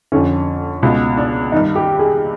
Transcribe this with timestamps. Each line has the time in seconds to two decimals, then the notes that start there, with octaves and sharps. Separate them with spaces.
0.12 F2 D3 C#4
0.83 C#2 B2
1.17 D4
1.52 G2 D#3 D#4
1.75 G4
1.99 G#4